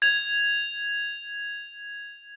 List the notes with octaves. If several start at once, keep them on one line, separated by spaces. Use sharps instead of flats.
G#6 F7